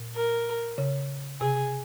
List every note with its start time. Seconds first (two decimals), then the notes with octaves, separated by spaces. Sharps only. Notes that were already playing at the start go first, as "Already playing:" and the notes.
Already playing: A#2
0.15 A#4
0.78 C#3
1.41 C3 G#4